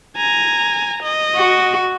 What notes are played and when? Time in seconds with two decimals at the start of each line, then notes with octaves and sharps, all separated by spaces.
0.17 G#5 A#5
1.03 D#5
1.36 F#4